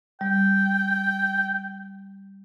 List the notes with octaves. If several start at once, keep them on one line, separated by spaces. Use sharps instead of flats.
G3 G5